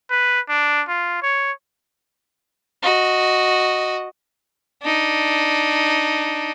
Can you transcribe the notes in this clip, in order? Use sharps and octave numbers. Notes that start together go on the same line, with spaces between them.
B4
D4
F4
C#5
F#4 D#5
D4 D#4